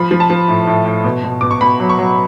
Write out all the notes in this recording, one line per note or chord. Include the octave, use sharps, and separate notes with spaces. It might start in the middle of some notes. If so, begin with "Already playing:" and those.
Already playing: F3 B5
F3
A5
F3
A2
A2
A2
B2
B2
B2 D6
C#6
B2 B5
F#3
C#6
F#3